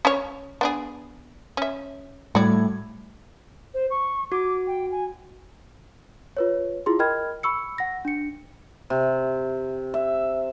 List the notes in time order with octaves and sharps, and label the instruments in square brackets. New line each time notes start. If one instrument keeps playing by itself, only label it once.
[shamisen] C#4 C#5
B3 D4 G#4
C#4 E5
[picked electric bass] A2 [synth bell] G3 G#6 [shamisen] F#4 D5
[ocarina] C5
C#6
[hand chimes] F#4 [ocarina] D6
[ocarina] G5
G#5
[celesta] F4 B4 C#5
E4 F4 G#4 C6
A#4 D#5 G5 B5 F6 G#6
B5 C#6 E6 C#7
F#5 A#6
D4 C#7
[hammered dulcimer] C3
E5